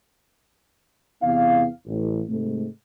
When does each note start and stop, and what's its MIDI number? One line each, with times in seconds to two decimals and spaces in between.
1.22 1.65 40
1.22 1.65 48
1.22 1.65 59
1.22 1.65 64
1.22 1.65 77
1.87 2.22 33
2.29 2.67 44
2.29 2.67 48
2.29 2.67 56
2.29 2.67 57